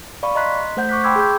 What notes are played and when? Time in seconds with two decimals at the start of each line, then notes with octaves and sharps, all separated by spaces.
0.23 D5 F5 B5 C#6
0.35 D#5 A#5 C6 F#6 B6
0.77 A3 C5 F#5 G6
0.89 C#6 D6 F#6 B6
1.04 G5 B5 C6 D6 E6 G#6
1.16 G#4 G5 G6